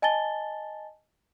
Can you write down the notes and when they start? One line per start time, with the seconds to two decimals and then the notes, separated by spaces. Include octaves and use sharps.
0.02 D#5 G#5 A5 A6 G7